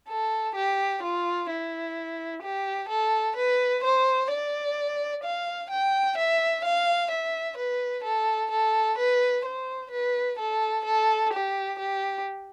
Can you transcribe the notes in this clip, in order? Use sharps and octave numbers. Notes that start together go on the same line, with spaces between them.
A4
G4
F4
E4
G4
A4
B4
C5
D5
F5
G5
E5
F5
E5
B4
A4
A4
B4
C5
B4
A4
A4
G4
G4